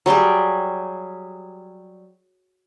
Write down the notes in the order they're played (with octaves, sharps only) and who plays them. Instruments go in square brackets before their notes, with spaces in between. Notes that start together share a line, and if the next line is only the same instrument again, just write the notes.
[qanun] F#3 G3 G4 G#4